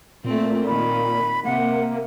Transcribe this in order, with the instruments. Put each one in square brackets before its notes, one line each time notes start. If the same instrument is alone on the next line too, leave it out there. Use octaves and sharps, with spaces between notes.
[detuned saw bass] A#2 [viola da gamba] A3 C4
[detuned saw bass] A#2 [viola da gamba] D#3 [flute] B5
[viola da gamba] C3 [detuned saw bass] A#3 [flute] F#5